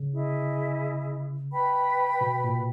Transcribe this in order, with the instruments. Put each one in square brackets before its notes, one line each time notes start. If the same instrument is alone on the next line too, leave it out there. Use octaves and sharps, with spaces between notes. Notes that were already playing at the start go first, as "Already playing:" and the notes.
Already playing: [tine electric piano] C#3
[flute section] E4 G#4 D#5
B4 G5 B5
[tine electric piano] B2
A#2